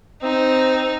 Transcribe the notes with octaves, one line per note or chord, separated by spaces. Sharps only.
C4 D#4